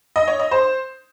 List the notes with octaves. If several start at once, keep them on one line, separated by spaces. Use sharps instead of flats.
D#5
C#5
D#5
C5